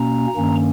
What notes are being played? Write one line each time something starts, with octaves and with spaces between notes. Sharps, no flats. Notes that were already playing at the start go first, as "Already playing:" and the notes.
Already playing: B2 A#3 C#4 A#5
G2 D#3 A#3 C#4